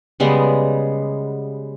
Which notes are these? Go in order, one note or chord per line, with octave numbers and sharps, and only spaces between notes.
C#3 G3 G#3 B3